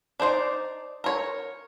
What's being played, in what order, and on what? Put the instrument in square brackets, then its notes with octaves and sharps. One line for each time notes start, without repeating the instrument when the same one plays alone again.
[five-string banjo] D4 D#4 C5 D5
A#4 C#5